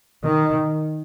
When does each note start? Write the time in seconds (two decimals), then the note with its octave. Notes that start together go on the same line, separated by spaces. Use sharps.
0.24 D#3